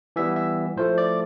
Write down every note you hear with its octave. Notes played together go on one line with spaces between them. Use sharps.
E3 G3 B3 E5
E5
A2 F3 A3 C5
D5